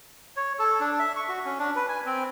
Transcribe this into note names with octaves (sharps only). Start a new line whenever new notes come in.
C#5
A4
D4
E5
C#6
F#4
C#4
D4
B4
G#5
C4